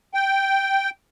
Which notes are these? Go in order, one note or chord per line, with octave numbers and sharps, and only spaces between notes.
G5